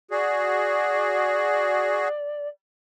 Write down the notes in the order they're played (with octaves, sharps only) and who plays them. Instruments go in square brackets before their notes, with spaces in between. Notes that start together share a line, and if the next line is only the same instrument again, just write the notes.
[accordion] F#4 G#4 [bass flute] D5